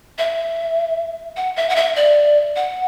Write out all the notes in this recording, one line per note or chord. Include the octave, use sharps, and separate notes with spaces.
E5
F#5
E5
F#5
E5
D5
F#5